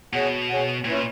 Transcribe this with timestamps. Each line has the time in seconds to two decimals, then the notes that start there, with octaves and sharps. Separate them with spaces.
0.13 B2 G#4 C#5 F#5
0.49 G#4 C#5 F#5
0.85 A#2 C#4 E4 B4